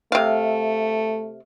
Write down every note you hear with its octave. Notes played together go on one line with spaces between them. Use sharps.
C3 A3 F5